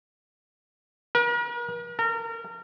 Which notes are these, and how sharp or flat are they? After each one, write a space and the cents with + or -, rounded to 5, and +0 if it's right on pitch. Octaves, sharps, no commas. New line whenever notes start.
A#4 +45
A#4 -30